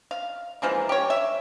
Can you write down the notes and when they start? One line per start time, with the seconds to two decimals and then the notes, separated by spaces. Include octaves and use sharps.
0.11 F5
0.62 E3 F3 G#3 A#3
0.89 G4 C#5
1.10 E5